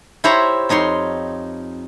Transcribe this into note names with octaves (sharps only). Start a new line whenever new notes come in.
E4 G4 C5 C#5 A#5 B5
F2 D#4 C#5 C6